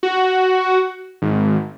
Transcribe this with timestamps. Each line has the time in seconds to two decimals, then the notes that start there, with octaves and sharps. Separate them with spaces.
0.03 F#4
1.22 G#1